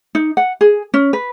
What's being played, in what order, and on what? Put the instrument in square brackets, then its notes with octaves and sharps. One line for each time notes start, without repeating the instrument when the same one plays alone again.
[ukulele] D#4
F#5
G#4
C#4
B4